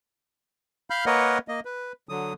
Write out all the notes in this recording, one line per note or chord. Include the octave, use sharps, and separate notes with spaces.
F5 B5 F6 G6
A#3 A#4 B4 C#5 D#5 F#5
A#3 D#5
B4
D3 F#3 D#6